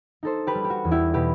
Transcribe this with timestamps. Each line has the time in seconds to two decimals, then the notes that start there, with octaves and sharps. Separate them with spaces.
0.23 D#4 A4 C5
0.47 G4 B4
0.55 G3
0.64 G4
0.70 F#4
0.85 E2
0.91 E4 G4
1.14 B2 G4 B4